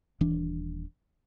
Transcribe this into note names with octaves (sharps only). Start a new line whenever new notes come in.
D#1 E3 D4